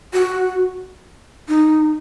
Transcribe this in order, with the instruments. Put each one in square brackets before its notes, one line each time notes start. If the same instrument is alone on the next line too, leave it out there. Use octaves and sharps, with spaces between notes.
[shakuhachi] F#4
D#4